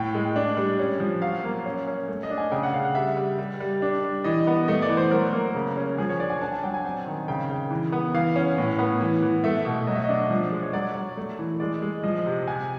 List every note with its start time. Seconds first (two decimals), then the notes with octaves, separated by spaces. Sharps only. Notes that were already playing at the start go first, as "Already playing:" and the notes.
Already playing: A2 G5
0.15 G#3
0.36 D4
0.57 G3
0.79 C#4
1.00 F3
1.22 F#3 F5
1.44 A#3
1.66 C#4
1.87 C#4
2.08 A3
2.23 D#5
2.30 D4
2.38 G#5
2.52 C#3 G5
2.63 F#5
2.73 C#3 F5
2.85 F#5
2.95 G3 E5
3.17 G3
3.39 G3
3.60 G3
3.82 D4
4.04 G3
4.24 E3 D#5
4.47 B3
4.68 A3 D#5
4.82 D5
4.89 E3
4.97 C5
5.11 F#3 A#4
5.33 A#3
5.55 C#3
5.77 C#4
5.98 F3 G#4
6.09 C#5
6.19 D4 D5
6.30 G#5
6.41 D4 A5
6.52 G#5
6.63 F#3 G5
6.74 G#5
6.84 C4
7.06 D#3
7.28 C#3 G5
7.50 C#3
7.70 E3
7.92 B3
8.14 E3 F5
8.36 C#4
8.58 A2
8.79 B3
9.01 E3
9.22 E3
9.44 A3 E5
9.65 B2
9.87 F#3 D#5
9.95 E5
10.04 D4 D#5
10.30 F3
10.52 G#3
10.63 C#5
10.73 F#3 D5
10.95 F#3
11.17 A3
11.39 E3
11.60 G#3 D5
11.82 G#3
12.04 F3 D#5
12.26 C3
12.47 C3 G#5